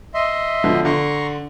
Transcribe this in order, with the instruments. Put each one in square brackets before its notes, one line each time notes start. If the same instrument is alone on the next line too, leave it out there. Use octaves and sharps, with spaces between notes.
[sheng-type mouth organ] D#5 E5 C6
[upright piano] B2 D3 F3
[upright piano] D3 [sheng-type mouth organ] A#5 C6 C#6